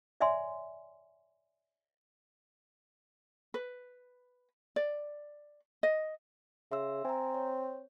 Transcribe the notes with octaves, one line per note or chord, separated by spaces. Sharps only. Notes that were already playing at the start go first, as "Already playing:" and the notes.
C#5 D5 E5 G#5 C6
B4
D5
D#5
C#3 E5 C6 E6
C4 G#5 A#5
C#5